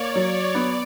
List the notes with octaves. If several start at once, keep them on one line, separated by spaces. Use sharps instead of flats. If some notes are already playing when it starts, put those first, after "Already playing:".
Already playing: A#3 C#5 D5
F#3
B3 D5